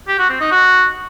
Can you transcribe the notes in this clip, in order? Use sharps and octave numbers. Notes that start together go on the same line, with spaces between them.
G4
F#4
C4
D#4
F#4